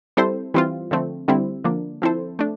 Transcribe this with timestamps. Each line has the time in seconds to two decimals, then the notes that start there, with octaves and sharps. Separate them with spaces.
0.17 G3 C4 E4 A4 C5
0.54 E3 G3 C4 F4
0.91 D3 F3 A3 C4
1.28 D3 G3 C4 E4
1.64 D3 F3 A#3 D4
2.02 F3 C4 E4 A4 C5
2.39 A3 D4